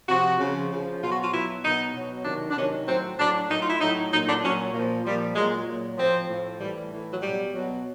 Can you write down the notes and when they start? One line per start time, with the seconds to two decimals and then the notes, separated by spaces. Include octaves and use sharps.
0.08 C3 F3 F#4
0.39 C#3 F3
0.71 C#3 F3
1.02 B2 F#3 F4
1.11 F#4
1.22 F4
1.33 B2 F#3 E4
1.64 B2 F#3 D#4
1.94 B2 F#3
2.25 C3 D#3 F#3 D4
2.51 D4
2.57 C3 D#3 F#3 C#4
2.87 A2 F#3 C4
3.18 A2 F#3 D4
3.49 A2 F#3 D#4
3.60 F4
3.70 E4
3.80 A2 F#3 D#4
4.12 A#2 F#3 D#4
4.27 D4
4.43 A#2 F#3 C#4
4.74 A#2 F3
5.04 A#2 F3 G3
5.35 A#2 F#3 G#3
5.67 A#2 F#3
5.98 A2 F3 C4
6.29 A2 F3
6.60 A2 E3 G3
6.91 A2 E3
7.11 F#3
7.22 B2 F#3 G3
7.53 B2 F#3